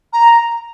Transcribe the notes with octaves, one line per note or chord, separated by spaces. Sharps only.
A#5